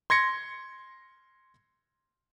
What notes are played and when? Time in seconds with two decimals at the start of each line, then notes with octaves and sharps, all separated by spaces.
0.10 C6 G#6 A#6 C#7